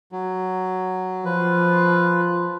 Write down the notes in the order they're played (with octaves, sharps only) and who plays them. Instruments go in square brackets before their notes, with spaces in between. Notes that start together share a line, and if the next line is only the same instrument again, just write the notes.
[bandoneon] F#3
[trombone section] F3 F4 [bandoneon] B4